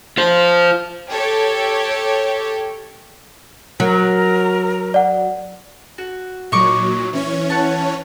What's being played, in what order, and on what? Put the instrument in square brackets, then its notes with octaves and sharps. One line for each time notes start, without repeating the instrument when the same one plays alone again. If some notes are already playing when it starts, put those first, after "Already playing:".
[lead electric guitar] F4 C5
[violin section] G4 A4 C#5
[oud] F#3 [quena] A#4
[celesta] D5 F#5
[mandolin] F#4
[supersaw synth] A#2 F#3 [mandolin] D#4 C#6 D6
[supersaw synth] E3 C#4 C#5
[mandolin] F#5 A5